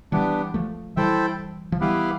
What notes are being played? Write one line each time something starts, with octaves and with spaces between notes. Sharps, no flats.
E3 G3 B3 D4 G4
F3 A3
E3 G3 E4 A4 C5 E5 G5
F3
E3 G3 B3 E4 G4 B4 F5